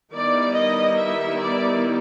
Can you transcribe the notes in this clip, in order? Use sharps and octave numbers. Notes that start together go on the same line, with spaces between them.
D#3 G3 B3 E4 D5
D#5
E5
D5